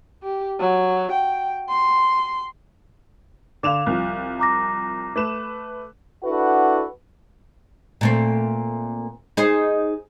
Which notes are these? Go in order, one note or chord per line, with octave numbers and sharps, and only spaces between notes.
G4
F#3
G5
C6
D3 F5 D6 E7 F7
C2 F3
A#5 D6 A#6
A3 B4 D6 E7
D4 E4 F#4 A4 B4 F#5
A#2 A3 C4
D#4 G#4 C5